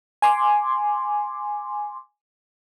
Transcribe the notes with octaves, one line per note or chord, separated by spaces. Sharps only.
G#5 C6 D6